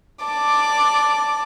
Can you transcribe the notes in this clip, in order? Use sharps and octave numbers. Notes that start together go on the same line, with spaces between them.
D5 A5 D6